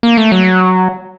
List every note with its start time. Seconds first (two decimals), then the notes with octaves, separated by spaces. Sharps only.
0.03 A#3
0.17 A3
0.32 F#3